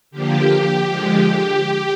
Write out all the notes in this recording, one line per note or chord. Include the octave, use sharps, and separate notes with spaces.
D3 F3 A#3 G4
D3 F3 G#3